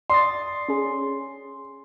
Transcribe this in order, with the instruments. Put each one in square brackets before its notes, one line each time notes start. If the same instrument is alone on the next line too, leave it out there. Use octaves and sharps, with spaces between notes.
[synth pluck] D5 D#6 A6 [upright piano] C6
[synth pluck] C#4 G#4